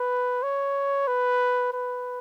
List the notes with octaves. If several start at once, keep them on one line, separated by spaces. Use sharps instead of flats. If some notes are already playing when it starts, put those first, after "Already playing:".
Already playing: B4
C#5
B4
B4